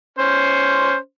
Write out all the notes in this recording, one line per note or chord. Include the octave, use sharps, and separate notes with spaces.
C#4 C5